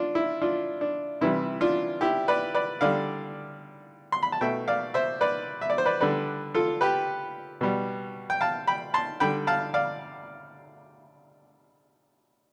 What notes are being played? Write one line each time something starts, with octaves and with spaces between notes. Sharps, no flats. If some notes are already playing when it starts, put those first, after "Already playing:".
Already playing: D4 F4
E4
D4 F4
D4
C3 E3 G3 E4
D4 F4
E4 G4
B4 D5
B4 D5
D3 G3 D5 F5
C6
B5
A5
B2 A3 E5 G5
D5 F5
C5 E5
B4 D5
E5
D5
C5
B4 D5
D3 G3 B4 D5
F4 A4
G4 B4
B2 G3
G5
F5 A5
G5 B5
A5 C6
D3 G3 G5 B5
F5 A5
D5 F5